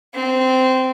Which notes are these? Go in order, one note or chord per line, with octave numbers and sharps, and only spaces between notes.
C4